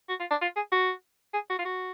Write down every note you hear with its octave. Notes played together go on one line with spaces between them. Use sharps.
F#4
F4
D4
F4
G#4
F#4
G#4
F#4
F4
F#4